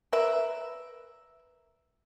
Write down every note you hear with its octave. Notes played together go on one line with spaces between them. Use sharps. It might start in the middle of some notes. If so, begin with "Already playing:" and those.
A#4 B4 E5